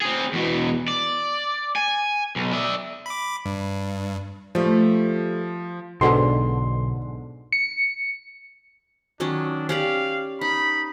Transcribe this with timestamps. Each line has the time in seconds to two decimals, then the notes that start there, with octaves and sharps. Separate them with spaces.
0.02 C4 G#4
0.33 E2 B2
0.88 D5
1.76 G#5
2.36 B1
2.53 D5 E5
3.06 B5 D6
3.45 G2
4.55 F3 G3 A3
6.01 B1 G#2 B2 D3 C6
7.52 C#7
9.20 D#3 F#3 C#4 D4
9.69 C#4 G4 D5 F5
10.41 D#4 B5